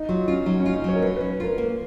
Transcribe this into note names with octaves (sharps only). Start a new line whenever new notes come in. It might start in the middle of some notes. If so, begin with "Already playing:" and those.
Already playing: D#4
F#3 F4
C#4 F4
F#3 D#4
C#4
F4
D#4
F#3 C#5
A#4
C#4 B4
C#4 B4
B4
F4 A#4
A#3